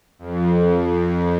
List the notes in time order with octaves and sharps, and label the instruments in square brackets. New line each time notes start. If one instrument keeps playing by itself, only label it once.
[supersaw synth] F2